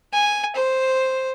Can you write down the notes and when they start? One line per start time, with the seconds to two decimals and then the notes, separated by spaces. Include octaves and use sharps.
0.13 G#5
0.55 C5